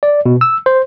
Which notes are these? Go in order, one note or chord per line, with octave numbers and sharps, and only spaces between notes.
D5
B2
E6
C5